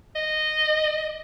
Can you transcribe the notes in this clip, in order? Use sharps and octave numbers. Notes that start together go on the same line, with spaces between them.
D#5